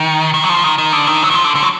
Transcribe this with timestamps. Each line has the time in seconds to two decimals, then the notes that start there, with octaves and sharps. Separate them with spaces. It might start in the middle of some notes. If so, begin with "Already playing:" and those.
Already playing: D#3
0.34 D#3
0.44 F#3
0.49 F3
0.64 D#3
0.78 D#3
0.92 D3
1.07 D#3
1.23 F#3
1.30 D#3
1.34 F3
1.44 D3
1.56 D3
1.62 F#3